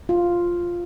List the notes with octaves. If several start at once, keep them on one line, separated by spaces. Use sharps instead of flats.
F4